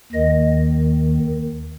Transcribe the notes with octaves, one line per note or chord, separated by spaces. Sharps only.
D#2 D#3 D#5